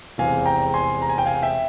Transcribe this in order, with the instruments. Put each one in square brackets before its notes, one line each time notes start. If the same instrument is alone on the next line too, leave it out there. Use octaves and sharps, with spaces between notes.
[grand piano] F1 E2 E3 G#3 C4 F5 G#5
G5 A#5
G#5 C6
A#5
G#5
G5
F5 G#5
E5 G5